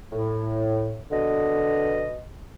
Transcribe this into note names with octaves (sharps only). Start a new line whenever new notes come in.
A2
B2 D3 D#5